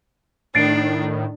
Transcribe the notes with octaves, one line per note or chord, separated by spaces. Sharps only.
A2 D#3 D4 A6 C7 D7